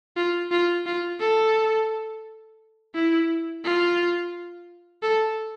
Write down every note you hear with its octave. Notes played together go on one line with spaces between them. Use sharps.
F4
F4
F4
A4
E4
F4
A4